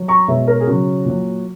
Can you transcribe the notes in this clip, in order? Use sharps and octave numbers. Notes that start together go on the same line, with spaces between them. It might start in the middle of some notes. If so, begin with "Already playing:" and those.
Already playing: F#3
A#5 C#6
B2 G#3 C#5 E5
A#4 C#5
G#4
C#3 F#3 F#4
A#2 F#3